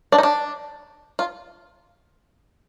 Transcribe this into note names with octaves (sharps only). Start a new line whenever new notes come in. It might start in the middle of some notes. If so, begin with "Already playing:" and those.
D4
D#4
D4
F4